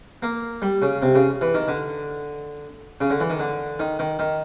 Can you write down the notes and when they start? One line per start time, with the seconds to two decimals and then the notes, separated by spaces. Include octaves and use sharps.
0.22 A#3
0.62 G3
0.82 C#3
1.02 C3
1.15 C#3
1.41 E3
1.54 D#3
1.68 D3
3.01 C#3
3.10 D3
3.20 E3
3.30 D#3
3.39 D3
3.79 D#3
3.99 D#3
4.19 D#3